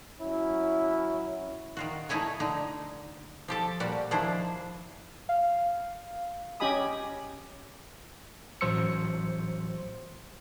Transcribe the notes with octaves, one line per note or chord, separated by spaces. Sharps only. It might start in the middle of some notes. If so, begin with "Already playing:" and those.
F#3 C#4 E4
D#3 F4 F#4
A3 D#4 E4 C#5 G#5
D3 D#4
F3 G4 A4
A#2 G3 F#4
D#3 F3 D4 E4 C5
F5
C#4 G4 D#5 G#5 B5 D#6
A1 F#3 C5 C6 E6 C#7